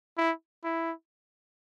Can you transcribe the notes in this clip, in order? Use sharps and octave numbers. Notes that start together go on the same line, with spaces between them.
E4
E4